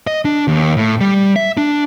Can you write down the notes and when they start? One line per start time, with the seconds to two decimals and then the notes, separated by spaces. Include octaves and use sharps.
0.07 D#5
0.25 D4
0.48 D#2
0.77 A2
1.01 G3
1.36 E5
1.57 D4